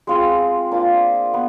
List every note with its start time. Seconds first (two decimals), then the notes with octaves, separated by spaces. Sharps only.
0.07 G#3 C4 F4 G#4
0.71 A#3 D4 F4
1.34 B3